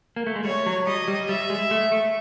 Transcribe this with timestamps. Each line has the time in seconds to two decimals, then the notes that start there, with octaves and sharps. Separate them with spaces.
0.16 A#3
0.27 A3
0.36 G#3
0.44 G3 C#5
0.66 F#3
0.87 G3 D#5
1.08 G3
1.29 G3 E5
1.50 G#3
1.71 A3
1.92 A3